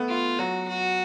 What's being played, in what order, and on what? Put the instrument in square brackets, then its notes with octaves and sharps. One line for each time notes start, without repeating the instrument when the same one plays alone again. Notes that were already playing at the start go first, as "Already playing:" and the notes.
Already playing: [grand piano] A3 B3
[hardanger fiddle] F4
[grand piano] F#3 [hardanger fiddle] F#4
[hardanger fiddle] F#4